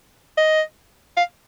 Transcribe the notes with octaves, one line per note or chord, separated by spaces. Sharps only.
D#5
F5